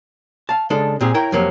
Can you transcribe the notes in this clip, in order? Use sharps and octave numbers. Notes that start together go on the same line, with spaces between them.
F5 A5
C#3 G#3 D4 A4
A#2 C4 G4 G#4
E4 A#4 C#5 G5
F2 C3 F#3 A#3